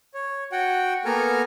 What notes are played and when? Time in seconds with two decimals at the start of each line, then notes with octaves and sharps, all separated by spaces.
0.14 C#5
0.52 F#4 F#5 G5
1.05 A#3 B3 A4 G#5 A#5 F6